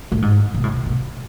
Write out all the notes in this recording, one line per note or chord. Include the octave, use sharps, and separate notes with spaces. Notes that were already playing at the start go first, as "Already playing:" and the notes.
A2
G#2
B2
A2
B2
B2